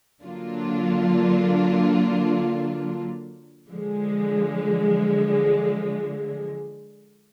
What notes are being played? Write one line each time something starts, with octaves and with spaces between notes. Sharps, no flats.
D3 F#3 A#3 D4 F4
D3 F3 G#3